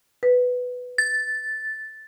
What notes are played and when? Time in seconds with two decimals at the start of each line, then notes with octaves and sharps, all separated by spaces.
0.23 B4
0.98 A6